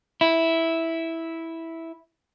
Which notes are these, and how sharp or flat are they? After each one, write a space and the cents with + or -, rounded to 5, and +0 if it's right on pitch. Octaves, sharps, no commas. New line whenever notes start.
E4 -5